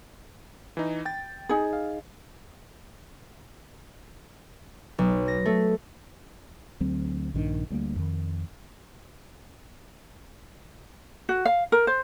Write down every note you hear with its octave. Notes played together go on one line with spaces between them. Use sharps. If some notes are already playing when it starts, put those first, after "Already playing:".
E3 D#4
G5 A6
D#4 G#4
F5
B1
A#6
A3
D2 F#3 C4
A#1 G2 D#3 D4
D2 G3 A3 A#3
F2 D#3
F#4
F5
A#4
C5